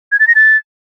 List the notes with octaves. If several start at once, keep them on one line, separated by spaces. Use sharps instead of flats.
G#6
A6
A#6
A6